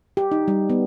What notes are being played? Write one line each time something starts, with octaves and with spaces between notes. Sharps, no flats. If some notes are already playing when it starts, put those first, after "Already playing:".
G4
D#4
G3
B3